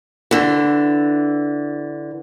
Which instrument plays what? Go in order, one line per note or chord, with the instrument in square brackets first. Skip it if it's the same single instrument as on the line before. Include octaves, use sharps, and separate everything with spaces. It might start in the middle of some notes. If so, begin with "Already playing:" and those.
[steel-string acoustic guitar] D3 E3